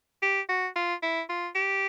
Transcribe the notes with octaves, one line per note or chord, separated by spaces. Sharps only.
G4
F#4
F4
E4
F4
G4